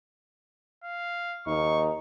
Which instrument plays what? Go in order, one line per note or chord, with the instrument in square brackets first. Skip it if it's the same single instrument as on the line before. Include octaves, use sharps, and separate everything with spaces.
[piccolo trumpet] F5
[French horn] D#2 [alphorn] D#4 [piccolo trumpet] C#6